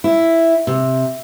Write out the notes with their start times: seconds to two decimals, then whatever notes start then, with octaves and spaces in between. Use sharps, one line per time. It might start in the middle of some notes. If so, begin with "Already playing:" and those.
0.04 E4
0.67 C3